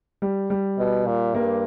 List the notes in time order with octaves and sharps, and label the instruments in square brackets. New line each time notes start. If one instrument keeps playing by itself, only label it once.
[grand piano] G3
G3
[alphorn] B2
A#2
[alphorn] G2 [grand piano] A#3